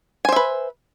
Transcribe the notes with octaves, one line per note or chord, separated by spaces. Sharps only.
B4 C5 E5 G#5